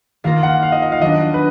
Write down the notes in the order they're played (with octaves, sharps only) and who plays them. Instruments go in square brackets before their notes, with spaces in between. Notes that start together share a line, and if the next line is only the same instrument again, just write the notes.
[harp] D#3 A#3 F4 A#4 [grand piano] F5
[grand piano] F#5
F5
D#5
D#5
F5
[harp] D#3 F#3 B3 D4 [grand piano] D#5
[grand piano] B4